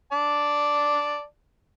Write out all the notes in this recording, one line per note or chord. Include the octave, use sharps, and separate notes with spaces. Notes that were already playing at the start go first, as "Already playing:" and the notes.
D5 A5